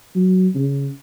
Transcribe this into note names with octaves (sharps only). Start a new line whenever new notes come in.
F#3
C#3